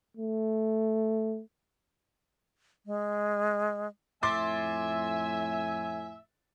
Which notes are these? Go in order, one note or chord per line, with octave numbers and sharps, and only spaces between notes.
A3
G#3
F2 A2 E5 G#5 C6 D6 A6